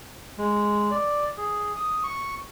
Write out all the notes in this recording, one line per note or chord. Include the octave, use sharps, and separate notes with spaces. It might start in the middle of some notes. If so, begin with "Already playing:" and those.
G#3
D5
G#4
D#6
C#6